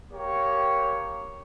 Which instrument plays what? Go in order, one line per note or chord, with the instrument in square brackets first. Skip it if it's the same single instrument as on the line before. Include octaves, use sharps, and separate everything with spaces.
[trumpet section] A#3 G4 C#5